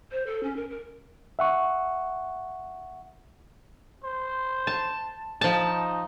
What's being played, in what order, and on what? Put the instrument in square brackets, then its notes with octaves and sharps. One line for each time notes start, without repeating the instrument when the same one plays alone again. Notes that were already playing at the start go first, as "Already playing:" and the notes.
[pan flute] C5
A4
C#4
A#4
A#4
[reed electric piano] E5 F#5 C#6
[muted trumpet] C5
[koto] A5
[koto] F3 A5 [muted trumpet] D#4